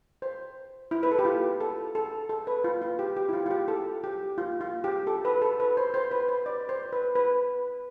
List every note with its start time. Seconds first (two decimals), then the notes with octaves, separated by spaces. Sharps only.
0.22 C5
0.91 E4
1.03 B4
1.11 A4
1.19 G4
1.25 F4
1.60 A4
1.95 A4
2.29 A4
2.47 B4
2.64 F4
2.82 F4
2.99 G4
3.16 G4
3.29 E4
3.33 F4
3.46 F4
3.51 G4
3.68 A4
4.04 G4
4.38 F4
4.61 F4
4.84 G4
5.07 A4
5.25 B4
5.42 A4
5.60 B4
5.77 C5
5.94 C5
6.11 B4
6.29 C5
6.46 D5
6.69 C5
6.93 B4
7.15 B4